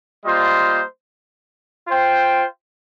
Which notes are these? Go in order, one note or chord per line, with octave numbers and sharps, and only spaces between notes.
G3 A#3 F4 C5 D#5
F4 C5 G5